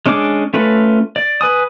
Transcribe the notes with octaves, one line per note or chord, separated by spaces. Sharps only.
G#3 C#4 D4 G#4 D6
A3 C#4 F4 B4
D5
B4 G#5 D#6